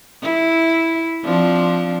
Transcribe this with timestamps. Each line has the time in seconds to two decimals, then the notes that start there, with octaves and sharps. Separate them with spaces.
0.23 E4
1.24 F3 C4 D4